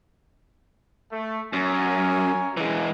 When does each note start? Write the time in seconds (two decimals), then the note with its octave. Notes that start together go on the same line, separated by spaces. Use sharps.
1.11 A3
1.53 F#2 A#4 C#5 G#5
2.57 E3 G#3